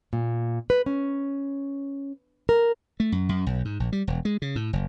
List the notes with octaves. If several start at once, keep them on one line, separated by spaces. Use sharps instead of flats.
A#2
B4
C#4
A#4
A3
F#2
F#2
B1
G#2
A#1
G3
E1
G#3
C#3
A2
F#1